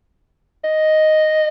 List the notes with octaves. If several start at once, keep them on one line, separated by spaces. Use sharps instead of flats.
D#5